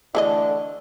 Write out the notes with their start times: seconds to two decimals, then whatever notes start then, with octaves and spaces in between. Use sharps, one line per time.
0.15 D3 E3 A3 D4 A4 D#5